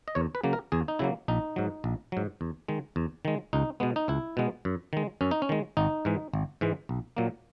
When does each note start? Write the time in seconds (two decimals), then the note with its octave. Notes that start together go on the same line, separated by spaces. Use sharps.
0.08 D#5
0.15 E2 C#5
0.35 B4
0.44 C#3 F#3 A#3
0.53 A#4
0.72 E2 G#4
0.88 D#4
0.99 C#3 F#3 A#3 E4
1.28 A#1 D#4
1.56 G#2 F#3
1.84 A#1
2.12 G#2 F#3
2.41 E2
2.68 D#3 G#3
2.96 E2
3.25 D#3 G#3
3.53 C#2 D#4
3.80 B2 G#3 B3
3.96 D#4
4.08 C#2 E4
4.37 B2 G#3 B3
4.65 F#2
4.93 D#3 G#3
5.21 F#2 C#4
5.31 D#4
5.42 C#4
5.49 D#3 G#3
5.77 G#1 D#4
6.05 G#2 E3 G#3
6.34 G#1
6.61 G#2 E3 G#3
6.89 B1
7.17 A#2 F#3 A#3